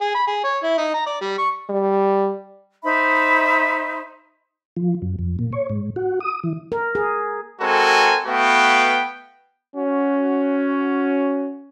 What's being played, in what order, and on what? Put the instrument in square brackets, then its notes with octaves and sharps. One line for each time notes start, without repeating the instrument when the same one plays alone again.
[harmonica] G#4
B5
G#4
C#5
E4
D#4
A#5
D5
G3
C#6
[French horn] G3
[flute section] D#4 C5 E5 B5
[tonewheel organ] F3
F#2
F2
A#2
C#5
G#2
F#4
D#6
E3
[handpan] A#4
G#4
[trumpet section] G#3 C4 F#4 A4 A#4 G#5
A3 B3 F#4 B4 F5 G5
[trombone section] C#4 F#4